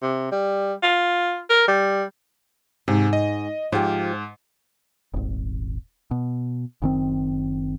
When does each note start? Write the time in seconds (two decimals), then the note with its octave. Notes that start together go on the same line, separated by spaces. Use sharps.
0.02 C3
0.32 G3
0.83 F4
1.50 A#4
1.68 G3
2.88 G#2 C3
3.13 D#5
3.72 G#2 F3 G4
5.14 D#1 G#1
6.11 B2
6.82 F#1 D#3 C4